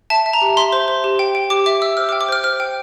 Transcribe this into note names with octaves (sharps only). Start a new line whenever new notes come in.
E5 A5
E5
A#5
G4
E5 C6
C5
C5
G4
G5
G5
G4 D6
E5 D6
E5 E6
C5 F6
D6
G5
D6
C5 F6
C5 F6
G5